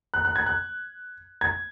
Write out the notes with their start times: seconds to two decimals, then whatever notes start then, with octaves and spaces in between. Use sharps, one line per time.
0.14 F#6
0.25 F#6
0.36 G#6
0.46 F#6
1.41 G#6